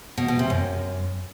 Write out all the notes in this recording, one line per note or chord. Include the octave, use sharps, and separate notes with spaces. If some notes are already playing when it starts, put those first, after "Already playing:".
B2
B2
C3
F#2